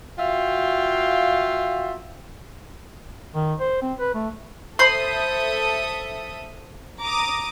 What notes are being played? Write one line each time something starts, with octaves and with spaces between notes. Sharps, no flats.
F4 F#4 E5 F5 G5
D#3
C5
C4
B4
A3
A4 C5 E5 B5 C6 D#6
A#5 D6 D#6